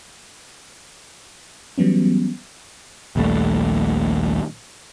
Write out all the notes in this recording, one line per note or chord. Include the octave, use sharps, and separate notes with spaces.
E3 F#3 G3 B3 C#4
A#1 D#2 G3 A3